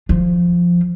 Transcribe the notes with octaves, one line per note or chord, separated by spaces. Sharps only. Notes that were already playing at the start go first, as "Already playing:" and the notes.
F3